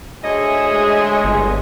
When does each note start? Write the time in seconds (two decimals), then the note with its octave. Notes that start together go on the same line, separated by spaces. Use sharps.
0.24 D2 G#4 C#5 D#5 E5
0.73 G#3
1.24 G1